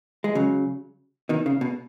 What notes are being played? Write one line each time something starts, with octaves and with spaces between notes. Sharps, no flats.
G#3
C#3 F#3
B2 D#3
C#3
B2